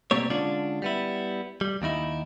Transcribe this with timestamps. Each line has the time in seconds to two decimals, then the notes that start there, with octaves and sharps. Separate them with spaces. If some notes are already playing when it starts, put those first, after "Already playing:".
0.11 B2 G3 A#3 C4 C#5
0.30 D3 G#3 C#4 D4 F4 D5
0.82 G3 B3 E4
1.61 G3
1.82 D#2 D#3 D#4 E4